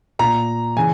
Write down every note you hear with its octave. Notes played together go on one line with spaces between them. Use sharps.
A#2 A#5
C#3 E3 G#5